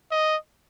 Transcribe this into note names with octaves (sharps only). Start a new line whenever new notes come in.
D#5